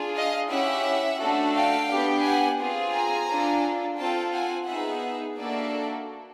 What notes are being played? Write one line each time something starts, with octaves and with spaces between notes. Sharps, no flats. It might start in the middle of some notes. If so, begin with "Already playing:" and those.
Already playing: D4 F4 G#4
D#5 F5
C#4 E4 G4 E5 F#5
A3 D4 F#4 A4
F5 G5
B3 D4 G4
F#5 G#5
C4 F4 G#4
G#5 A#5
D4 F4 A4
C4 F4 A4 G5 A5
F#5 G#5
B3 D#4 G#4 E5 F#5
A#3 D4 F#4 A4 D5 E5